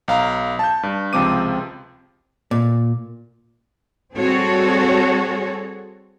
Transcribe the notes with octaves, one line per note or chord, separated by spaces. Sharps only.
B1 F5 A#5
A5 G6
G2
C#2 C3 F3 C4 D6 D#7
A#2
G3 C4 F#4 G#4 A4 C#5